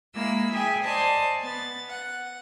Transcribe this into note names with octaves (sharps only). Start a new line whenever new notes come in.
G#3 A#3 E4 E6
G#4 E5 G5 G#5
C5 D5 D#5 G#5 A5
B3 A6
F#5